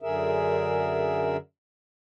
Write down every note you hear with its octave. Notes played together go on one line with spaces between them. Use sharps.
F#2 D3 G#4 A#4 E5